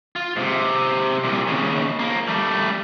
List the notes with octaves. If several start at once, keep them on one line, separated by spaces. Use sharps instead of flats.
F4
G#2 C3
C2 A#2
D#2 C#3
F3 A#3
G3 A3